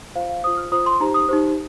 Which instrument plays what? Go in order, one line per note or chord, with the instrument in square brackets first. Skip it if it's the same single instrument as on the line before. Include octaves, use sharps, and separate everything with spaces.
[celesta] F4 C5 F5
F5
F4 C5 D#6
F6
F4 C5 D#6
C6
D#4 G4 C5 A#5
D#6
D#4 G4 C5